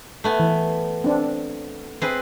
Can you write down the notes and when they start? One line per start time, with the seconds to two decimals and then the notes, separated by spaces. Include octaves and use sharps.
0.24 A3 B3 G#5
0.39 E3
1.04 C4 D4
2.02 C4 G#4 B4